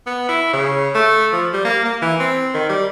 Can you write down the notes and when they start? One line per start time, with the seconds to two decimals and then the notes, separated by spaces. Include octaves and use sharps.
0.06 B3
0.29 E4
0.53 C#3
0.95 A3
1.33 F3
1.53 G3
1.65 A#3
1.85 A#3
2.02 E3
2.20 C4
2.54 D#3
2.69 G3